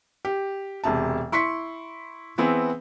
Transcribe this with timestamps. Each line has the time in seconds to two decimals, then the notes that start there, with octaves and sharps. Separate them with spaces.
0.25 G4
0.84 E1 C3 A5
1.32 E4 C6 C#6 B6 C#7
2.38 E3 B3 C4 E4 G#4